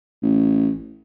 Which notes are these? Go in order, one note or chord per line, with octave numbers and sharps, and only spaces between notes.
A1